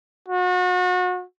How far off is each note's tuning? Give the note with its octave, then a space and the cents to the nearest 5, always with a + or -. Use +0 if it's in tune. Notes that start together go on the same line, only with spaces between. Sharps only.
F#4 -35